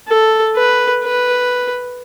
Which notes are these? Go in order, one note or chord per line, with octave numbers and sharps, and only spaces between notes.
A4
B4
B4